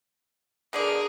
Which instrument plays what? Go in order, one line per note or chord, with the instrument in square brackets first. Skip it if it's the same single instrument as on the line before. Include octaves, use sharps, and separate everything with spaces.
[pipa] B2 D3 D5 [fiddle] G#4 A#4